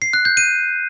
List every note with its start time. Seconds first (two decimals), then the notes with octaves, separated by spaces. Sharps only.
0.02 C7
0.13 F#6
0.25 G6
0.37 D#7